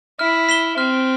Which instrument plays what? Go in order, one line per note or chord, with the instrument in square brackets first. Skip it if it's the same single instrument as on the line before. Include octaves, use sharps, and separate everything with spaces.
[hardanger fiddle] E4 [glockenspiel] F6
[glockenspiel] B6 E7 G7
[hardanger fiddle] C4 [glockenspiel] F6